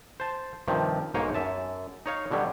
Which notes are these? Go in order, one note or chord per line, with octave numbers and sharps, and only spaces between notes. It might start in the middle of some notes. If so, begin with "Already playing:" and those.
C5 A5
G2 C3 D#3 F3
B1 G#2 A#3 C5 C#5 G#5
F#2 E5 A5
D#4 C#5 F5
B2 D3 F#3 G3